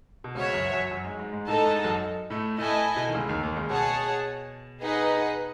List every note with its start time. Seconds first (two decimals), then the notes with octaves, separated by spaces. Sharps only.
0.24 B2
0.35 C#2 C#3 F#4 C#5 E5
0.54 F#2 F#3
0.72 F#2 F#3
0.91 F#2 F#3
1.05 G#2 G#3
1.19 G#2 G#3
1.32 G#2 G#3
1.47 A2 A3 D#4 A4 D#5 A5
1.66 G#2 G#3
1.84 F#2 F#3
2.30 A2 A3
2.58 A2 A3 E4 A4 D#5 G#5
2.97 B2
3.08 D#3
3.15 C#2 C#3
3.29 D#2 D#3
3.43 D#2 D#3
3.57 C#2 C#3
3.70 B2 G#4 C#5 F#5 A5
4.82 D#4 G#4 B4 D#5 F#5